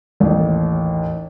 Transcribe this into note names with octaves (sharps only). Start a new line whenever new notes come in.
A1 D#2